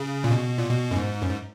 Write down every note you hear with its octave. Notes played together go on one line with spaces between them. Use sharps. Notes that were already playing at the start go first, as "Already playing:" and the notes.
Already playing: C#3
A#2
B2
A#2
B2
F#2
G#2
F#2
G#2